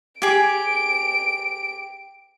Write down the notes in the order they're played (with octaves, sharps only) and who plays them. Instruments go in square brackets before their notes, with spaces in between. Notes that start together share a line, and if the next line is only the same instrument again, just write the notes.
[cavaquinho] G4 G#4 [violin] D7